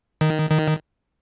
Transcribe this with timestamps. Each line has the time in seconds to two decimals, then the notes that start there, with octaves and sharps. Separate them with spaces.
0.21 D#3
0.50 D#3